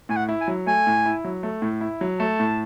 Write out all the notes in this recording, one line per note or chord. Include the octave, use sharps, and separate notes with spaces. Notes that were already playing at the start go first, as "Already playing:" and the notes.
A2 G#5
F#5
E4
G#5
F#3
A3 G#5
A2
E4
F#3
A3
A2
E4
F#3
A3 A5
A2